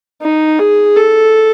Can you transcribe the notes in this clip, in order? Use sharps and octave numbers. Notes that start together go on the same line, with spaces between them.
D#4
G#4
A4